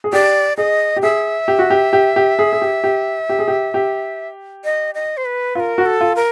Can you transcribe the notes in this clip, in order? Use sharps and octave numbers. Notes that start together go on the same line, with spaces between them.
G#4
G4 D5
G#4 D#5
G4
G#4 E5
G4
F#4
G4
G4
G4
G#4
G#4
G4
G4
G4
G#4
G4
G4
D#5
D#5
C5
B4
F4 A#4 B4
F#4
A4
F4
A#4